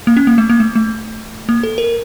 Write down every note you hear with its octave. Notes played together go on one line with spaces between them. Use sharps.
A#3
C#4
A#3
A3
A#3
A3
A3
A#3
A4
A#4